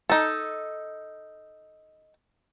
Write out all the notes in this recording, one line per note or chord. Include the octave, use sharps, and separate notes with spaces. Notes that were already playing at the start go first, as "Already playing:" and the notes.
D#4 A4